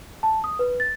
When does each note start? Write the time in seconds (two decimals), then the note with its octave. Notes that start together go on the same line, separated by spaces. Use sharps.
0.23 A5
0.44 D#6
0.59 B4
0.80 A6